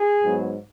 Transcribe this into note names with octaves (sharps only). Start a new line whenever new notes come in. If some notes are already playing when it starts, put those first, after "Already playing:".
Already playing: G#4
G#2 F#3 B3